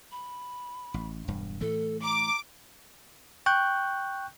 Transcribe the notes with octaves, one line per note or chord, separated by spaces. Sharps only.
B5
A1
E1 G2
A2 E3 A3 A4
A#5 D6
G5 C#6 F#6 G6